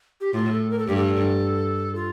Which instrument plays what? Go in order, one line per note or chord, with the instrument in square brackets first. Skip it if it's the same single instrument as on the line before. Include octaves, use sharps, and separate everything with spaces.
[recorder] G4
[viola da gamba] A2 [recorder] F4
[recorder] A4
A#4
A4
[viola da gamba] G2 [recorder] G4
[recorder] A4
F4